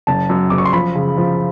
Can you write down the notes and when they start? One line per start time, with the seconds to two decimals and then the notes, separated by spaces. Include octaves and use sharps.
0.07 F#1 A5
0.29 F#2
0.50 F#1 D6
0.58 C#6
0.65 C6
0.73 F3 B5
0.95 C#3
1.18 F3